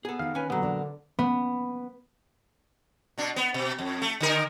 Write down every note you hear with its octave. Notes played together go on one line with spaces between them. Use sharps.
B3 G#4 A4
D#3 G4 A#4 F5
C#4 B4 G#5
A#2 D3 F#3 B3
D4 A#4 D5
B3
B2 D4
B3
B2
F2
A3
D3 D#4 A#4